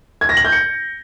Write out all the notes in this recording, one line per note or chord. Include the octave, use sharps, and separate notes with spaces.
G#6
A#6
F#7
G6
C#7